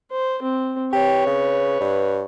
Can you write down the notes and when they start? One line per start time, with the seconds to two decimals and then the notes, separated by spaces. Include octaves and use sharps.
0.11 C5
0.42 C4
0.93 G4 B4 C#5
1.27 C#3
1.81 G2